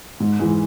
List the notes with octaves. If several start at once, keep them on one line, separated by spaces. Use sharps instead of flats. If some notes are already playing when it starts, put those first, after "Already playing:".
G#2
E3 G#3